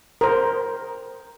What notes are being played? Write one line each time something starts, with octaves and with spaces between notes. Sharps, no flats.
A#4 C5